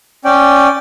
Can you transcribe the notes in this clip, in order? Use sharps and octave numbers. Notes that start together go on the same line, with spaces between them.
C#4 D5 G5